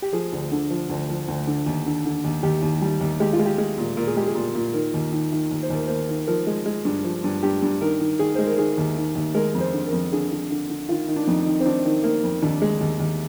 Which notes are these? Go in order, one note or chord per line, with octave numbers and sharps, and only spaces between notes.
G4
F3 G#4
D2
D3
F3
D2
F3
D2
D3
D#2
D3
D3
D#2
D#2 G4
D#2
G3
D#2
G#3 G4
F4
G#3
G4
G#3
A#2
A#2 A#4
G#4
G#3 G4
G#4
A#2
A#2
D#3 A#4
D#2
D#3
D#3
D#2
C5
D#2
A#4
A#3 C5
D#3
F3 A#4
G#3
G#3
G2
F3
G2
G2 G4
G2
D#3 A#4
D#3
D#3 G#4
G#3 C5
A#4
D#3 G#4
D#2
D#3
D#2
G#3 A#4
F2
C5
D3
A#4
F2
D3 G#4
D3
D3
D3
D#3 F4
D#3
D4
F2 D#4
D#3
C4
D#3 D4
D#3
A#3
F2
D#2 D4
G#3
D#2
D#2